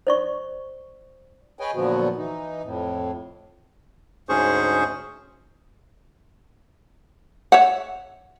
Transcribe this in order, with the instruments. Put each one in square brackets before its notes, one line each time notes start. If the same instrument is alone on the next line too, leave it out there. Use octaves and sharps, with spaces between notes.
[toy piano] C5 D5 C#6
[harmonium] G#4 B4 C#5 D#5 G5 G#5
A#2 D3 F3 F#3 B3 F#4
E3 D#4
F2 A2
[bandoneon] D2 G#2 C#4 G#4 C5 C#6
[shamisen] C#5 E5 F#5